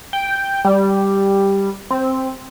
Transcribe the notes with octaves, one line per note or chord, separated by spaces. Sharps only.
G5
G3
C4